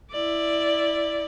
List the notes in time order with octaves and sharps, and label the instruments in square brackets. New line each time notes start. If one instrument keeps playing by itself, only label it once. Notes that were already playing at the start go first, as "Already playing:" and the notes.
[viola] E4 D5